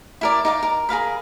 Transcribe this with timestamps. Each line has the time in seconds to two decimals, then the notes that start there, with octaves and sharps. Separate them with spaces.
0.21 E4 A#4 D5
0.45 D#4 D5 F5
0.63 A#4
0.89 G#4 A#4 F5 B5